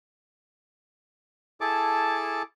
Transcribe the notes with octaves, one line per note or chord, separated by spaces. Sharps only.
E4 G#4 A4 A5 D6